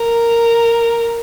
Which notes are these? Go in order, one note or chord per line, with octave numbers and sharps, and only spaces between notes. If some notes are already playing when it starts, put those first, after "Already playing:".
Already playing: A#4